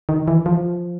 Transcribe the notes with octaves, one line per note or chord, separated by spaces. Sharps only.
D#3
E3
F3